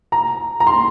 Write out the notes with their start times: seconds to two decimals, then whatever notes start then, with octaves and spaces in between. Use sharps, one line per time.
0.12 A#5
0.60 A#5
0.67 C6